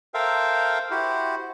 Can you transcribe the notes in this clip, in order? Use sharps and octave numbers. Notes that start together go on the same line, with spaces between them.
A4 A#4 C5 E5 F5 G5
E4 F#4 G4 C5